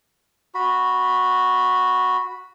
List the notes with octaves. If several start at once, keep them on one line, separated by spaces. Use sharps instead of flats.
F#4 B5